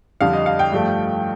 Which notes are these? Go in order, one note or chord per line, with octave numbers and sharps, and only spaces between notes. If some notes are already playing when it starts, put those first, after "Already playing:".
F2 D3 G3 F5
D#5
F5
G5
G2 F3 A3